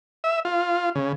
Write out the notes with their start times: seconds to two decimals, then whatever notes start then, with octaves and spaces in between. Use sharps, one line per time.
0.24 E5
0.45 F4
0.95 C#3